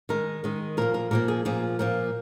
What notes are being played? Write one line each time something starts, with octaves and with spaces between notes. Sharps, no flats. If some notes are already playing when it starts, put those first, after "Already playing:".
D#3 G#3 A#4
D#3 G#3
A#2 F3 A#3 A#4
A#4
A#2 F3 A#3 A#4
G#4
A#2 F3 A#3 G#4
A#2 F3 A#3 A#4